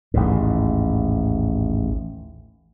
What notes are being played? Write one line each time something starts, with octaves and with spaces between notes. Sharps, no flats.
A1 D#2 G#2